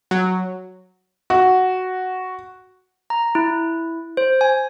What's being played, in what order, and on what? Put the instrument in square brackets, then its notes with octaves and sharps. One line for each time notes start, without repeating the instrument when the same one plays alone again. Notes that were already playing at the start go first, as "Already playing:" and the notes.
[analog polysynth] F#3
[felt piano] F#4
[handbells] A#5
E4
C5
G#5